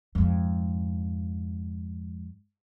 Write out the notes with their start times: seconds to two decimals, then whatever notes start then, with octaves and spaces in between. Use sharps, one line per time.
0.15 F2 G#2